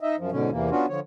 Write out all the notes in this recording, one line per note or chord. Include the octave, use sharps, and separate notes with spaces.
D#4 D#5 E5
F#2 F3
G#2 B2 D3 C#4
E2 C3 E3 A#3
B3 C#4 D4 F4 F#4
D3 F3 C#5